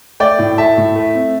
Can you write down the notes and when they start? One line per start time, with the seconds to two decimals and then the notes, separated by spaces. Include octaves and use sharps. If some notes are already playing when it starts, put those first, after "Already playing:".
0.20 A3 D5 G5
0.39 A2
0.58 A3 E5 A5
0.77 A2
0.96 A3
1.15 C4